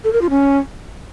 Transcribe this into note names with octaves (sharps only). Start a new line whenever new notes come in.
A4
A#4
F4
C#4